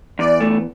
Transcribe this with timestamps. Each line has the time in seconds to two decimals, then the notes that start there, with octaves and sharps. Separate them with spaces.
0.19 E2 D5
0.41 A3